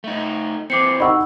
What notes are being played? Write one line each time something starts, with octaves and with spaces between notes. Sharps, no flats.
A3 D#4
E3 C4 D6 C7 C#7
D#4 F#5 B5 C#6 E6